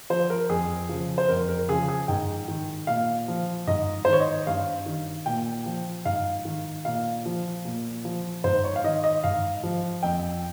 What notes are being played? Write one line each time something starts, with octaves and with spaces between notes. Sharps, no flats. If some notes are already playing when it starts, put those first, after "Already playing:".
F3 C5
A#4
F2 G#4
C#3 F3
C5
F2 A#4
A#4
C#3 F3 G#4
G#4
G#2 G5
D#3
A#2 F5
F3
G#2 D#5
C5
D#3
C#5
D#5
G2 F5
D#3
A#2 G5
F3
G#2 F5
D#3
A#2 F5
F3
A#2
F3
G#2 C5
C#5
F5
D#3 D#5
D#5
G#2 F5
F3
F2 G5